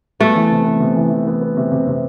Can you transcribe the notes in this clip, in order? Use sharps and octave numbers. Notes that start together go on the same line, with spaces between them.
A3 B3
E3
C3
B3
C3
E3
E3
B3
B3
C3
C3
C3